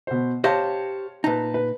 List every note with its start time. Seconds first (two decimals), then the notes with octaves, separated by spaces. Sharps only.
0.07 B2 C5
0.44 G4 C5 C#5 D#5 F5 A5
1.24 A#2 D#4 B4 A5
1.54 B4